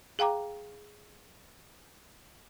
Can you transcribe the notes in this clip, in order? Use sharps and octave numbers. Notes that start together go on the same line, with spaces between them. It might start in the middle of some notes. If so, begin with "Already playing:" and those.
G#4 F5 G5 A#5 D6